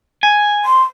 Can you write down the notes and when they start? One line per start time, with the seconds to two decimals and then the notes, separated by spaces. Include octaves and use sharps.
0.23 G#5
0.65 C6